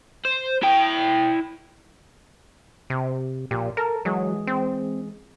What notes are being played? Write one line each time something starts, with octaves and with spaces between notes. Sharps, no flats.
C5
E4 G5
C3
A#1 A#2 G4
A4 A#4 A5 A#5
E3 F#3 G#3 G#4
C4